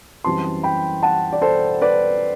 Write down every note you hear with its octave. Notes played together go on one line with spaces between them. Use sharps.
F#2 E3 G3 C4 A5 C6
G5 B5
F#5 A5
D5
A4 C5
B4 D5